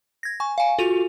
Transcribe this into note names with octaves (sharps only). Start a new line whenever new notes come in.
G#6 A#6
G#5 C#6
F5 G#5
F4 F#4 A4 D#7 F7